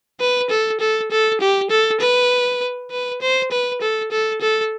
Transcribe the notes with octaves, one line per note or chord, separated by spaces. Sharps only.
B4
A4
A4
A4
G4
A4
B4
B4
C5
B4
A4
A4
A4